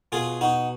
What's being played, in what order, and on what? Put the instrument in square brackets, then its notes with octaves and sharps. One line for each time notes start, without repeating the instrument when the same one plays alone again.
[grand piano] B2 [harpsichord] F4 G#4
[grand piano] B2 [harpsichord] D#4 F#4